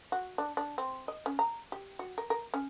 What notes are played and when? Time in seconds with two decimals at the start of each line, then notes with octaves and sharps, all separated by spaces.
0.12 F#4
0.38 D4
0.57 D4
0.78 C4
1.08 D#5
1.26 C#4
1.39 A#5
1.72 G4
1.99 F#4
2.18 A#4
2.30 A#4
2.54 C#4